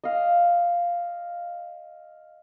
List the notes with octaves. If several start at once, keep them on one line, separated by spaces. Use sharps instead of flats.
D#5 F5